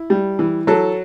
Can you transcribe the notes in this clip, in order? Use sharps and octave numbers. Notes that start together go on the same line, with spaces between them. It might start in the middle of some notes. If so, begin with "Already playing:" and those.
Already playing: E4
G3
E3
F#3 A4